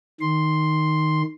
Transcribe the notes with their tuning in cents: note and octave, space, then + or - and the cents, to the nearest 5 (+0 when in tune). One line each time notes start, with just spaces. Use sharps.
D#3 +0 C6 +0